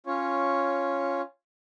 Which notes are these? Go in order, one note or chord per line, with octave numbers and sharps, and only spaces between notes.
C#4 F4 C#5